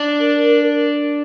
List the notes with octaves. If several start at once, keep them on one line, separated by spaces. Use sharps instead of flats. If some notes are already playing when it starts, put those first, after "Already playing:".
Already playing: D4
A#4